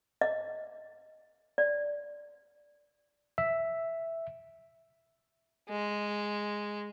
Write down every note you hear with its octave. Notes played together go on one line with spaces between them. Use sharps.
D#5
D5
E5
G#3